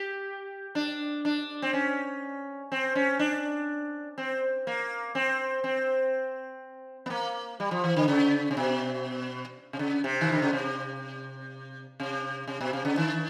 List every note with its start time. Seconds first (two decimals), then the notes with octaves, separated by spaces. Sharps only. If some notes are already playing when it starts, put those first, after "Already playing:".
Already playing: G4
0.75 D4
1.25 D4
1.62 C4
1.73 C#4
2.72 C4
2.95 C#4
3.19 D4
4.18 C4
4.67 A#3
5.15 C4
5.64 C4
7.06 B3
7.10 A#3
7.60 G3
7.71 F3
7.84 E3
7.96 D3
8.08 C#3
8.51 C3
8.57 B2
9.73 C3
9.79 C#3
10.04 C3
10.21 D#3
10.32 D3
10.42 C#3
10.53 C3
12.00 C3
12.48 C3
12.61 B2
12.73 C3
12.85 C#3
12.97 D#3